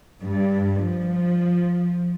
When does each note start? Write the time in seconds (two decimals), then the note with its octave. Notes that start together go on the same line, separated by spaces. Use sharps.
0.22 G2
0.83 F3